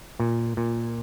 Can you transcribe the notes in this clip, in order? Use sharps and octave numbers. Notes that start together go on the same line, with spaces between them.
A#2
A#2